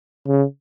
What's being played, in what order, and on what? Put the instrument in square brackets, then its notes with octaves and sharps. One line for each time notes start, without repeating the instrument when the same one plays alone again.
[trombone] C#3